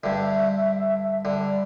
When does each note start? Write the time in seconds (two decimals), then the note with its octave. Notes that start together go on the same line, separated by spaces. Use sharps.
0.04 G2 D3 E5
1.25 D3 G3